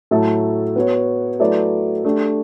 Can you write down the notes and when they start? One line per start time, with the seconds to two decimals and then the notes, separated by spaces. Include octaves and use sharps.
0.11 A2 F#3 A3 E4 A4
0.76 B3 F#4 C#5
1.39 F#3 A3 E4 B4 D5
2.05 A3 D4 G4